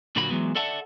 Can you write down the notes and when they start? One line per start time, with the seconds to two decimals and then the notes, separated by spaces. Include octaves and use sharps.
0.16 A#2 D3 F#3 A#3 F#4 B5
0.30 E3 F#3 G#3 B3
0.55 A4 D5 E5 F#5 A5